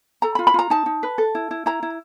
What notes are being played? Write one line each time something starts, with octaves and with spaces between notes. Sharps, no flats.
A4 A#5
B5
F4
B5
F4 A#5
D#4 A5
D#4
B4
A4
E4
E4
E4 A#5
E4